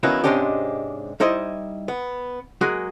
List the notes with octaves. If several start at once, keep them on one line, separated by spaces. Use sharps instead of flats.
D#3 F#3 A#3 B3 C#4 E4
G#2 C3 G#3 C#4 D4 G4
G3 D#4 E4 C5 D5 D#5
B3
F#3 G#3 A#3 F#4 G#4